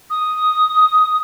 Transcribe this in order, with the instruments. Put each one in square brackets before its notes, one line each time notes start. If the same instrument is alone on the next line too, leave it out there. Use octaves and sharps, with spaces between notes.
[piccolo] D#6